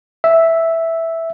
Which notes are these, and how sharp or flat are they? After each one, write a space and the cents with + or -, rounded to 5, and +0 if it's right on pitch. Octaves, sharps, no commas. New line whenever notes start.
E5 +0